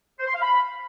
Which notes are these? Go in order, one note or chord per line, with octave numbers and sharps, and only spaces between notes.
C5
C6
F5
B5